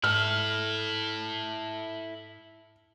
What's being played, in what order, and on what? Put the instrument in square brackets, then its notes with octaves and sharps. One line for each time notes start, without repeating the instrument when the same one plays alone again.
[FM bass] G#2 [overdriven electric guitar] E4 A4 [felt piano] F6